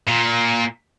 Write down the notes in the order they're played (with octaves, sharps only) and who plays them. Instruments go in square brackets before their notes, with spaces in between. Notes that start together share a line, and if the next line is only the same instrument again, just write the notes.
[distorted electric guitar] A#2